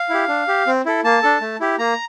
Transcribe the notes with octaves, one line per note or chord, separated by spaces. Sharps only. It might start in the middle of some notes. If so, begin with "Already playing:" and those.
Already playing: F5
E4 G4
D4
G4
C4
E4 A4
A#3 A5
D4 A4
A3
E4 G4
A#3 A#5